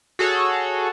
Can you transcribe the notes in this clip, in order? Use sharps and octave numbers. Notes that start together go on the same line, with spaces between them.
F#4 G#4 A4 C#5